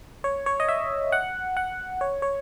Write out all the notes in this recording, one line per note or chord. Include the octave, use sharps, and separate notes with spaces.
C#5
C#5
D#5
E5
F#5
F#5
C#5
C#5